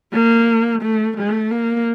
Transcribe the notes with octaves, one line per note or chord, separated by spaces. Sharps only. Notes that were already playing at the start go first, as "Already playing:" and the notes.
A#3
A3
A3
A#3